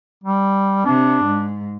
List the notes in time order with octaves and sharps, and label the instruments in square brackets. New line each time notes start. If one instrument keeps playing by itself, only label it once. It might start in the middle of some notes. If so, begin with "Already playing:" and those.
[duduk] G3
[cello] C3 [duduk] D4
[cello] G#2